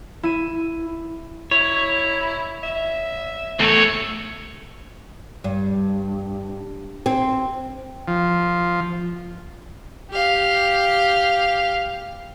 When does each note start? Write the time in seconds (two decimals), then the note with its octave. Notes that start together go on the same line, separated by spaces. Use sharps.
0.23 E4 D#7
1.51 E4 C#5
2.63 E5
3.60 E2 A3 A4 C#5
5.44 G2
7.06 C4
8.08 F3
10.11 G4 F5